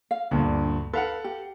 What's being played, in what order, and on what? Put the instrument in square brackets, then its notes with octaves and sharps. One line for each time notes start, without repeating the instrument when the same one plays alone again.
[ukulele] F5
[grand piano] D2 G2 A#2 [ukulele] D4
[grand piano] A4 F5 F#5 [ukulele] B4
[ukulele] G4